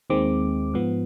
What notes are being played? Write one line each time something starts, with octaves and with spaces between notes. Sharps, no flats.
D#2 D#3 G#3 C4 D6
G#2 F3 B3